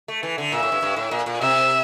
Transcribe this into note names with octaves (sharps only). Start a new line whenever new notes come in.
A3
E3
D3
A#2 E5
A2
G2
G2
A2
A#2
A#2
C3 E5